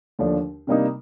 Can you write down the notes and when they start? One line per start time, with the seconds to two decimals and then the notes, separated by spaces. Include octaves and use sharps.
0.19 D#2 D3 F3 A3 D4
0.67 C3 G3 A#3 D#4